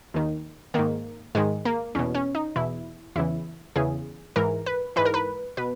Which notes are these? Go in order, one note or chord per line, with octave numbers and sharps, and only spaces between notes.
D#2 D#3
G#2 D#3 A#3
G#2 D#3 G#3
A#3
E2 B2 C#4
C#4
D#4
E2 B2 E4
E2 C#3 E3 E4
E2 C#3 E3 G#4
G#2 E3 A#4
B4
G#2 E3 B4
A#4
B4
B2 B4